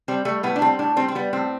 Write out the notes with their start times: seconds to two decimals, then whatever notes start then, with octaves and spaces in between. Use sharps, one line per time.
0.08 G3 C4
0.25 G3 A3
0.43 A2 B3
0.56 D4
0.61 G3 C4
0.79 A2 D4
0.96 G3 C4
1.08 C4
1.15 G3 B3
1.33 A2 C4